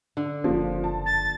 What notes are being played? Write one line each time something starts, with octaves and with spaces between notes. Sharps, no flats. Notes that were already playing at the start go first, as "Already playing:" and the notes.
D3
F#1 F3 A#3
A5
A6